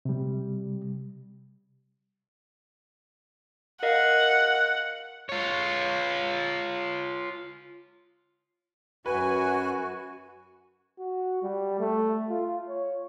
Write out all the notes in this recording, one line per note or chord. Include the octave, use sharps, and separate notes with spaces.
C3 G3
A#4 D#5 F5 F#5
F4 C#5
F#2 F#4 B4 G#5
F#4
G3
A3
F4
C#5